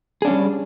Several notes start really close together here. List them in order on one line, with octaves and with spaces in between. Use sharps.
G#4 D4 C#4 G3